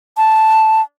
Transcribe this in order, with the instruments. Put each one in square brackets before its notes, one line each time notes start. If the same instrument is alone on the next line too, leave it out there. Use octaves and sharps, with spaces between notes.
[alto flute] A5